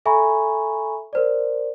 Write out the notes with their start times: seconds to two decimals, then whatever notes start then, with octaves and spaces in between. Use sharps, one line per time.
0.06 A4 E5 G#5 A#5 B5 C#6
1.13 A#4 C5 D5